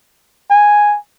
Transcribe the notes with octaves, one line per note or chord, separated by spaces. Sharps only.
G#5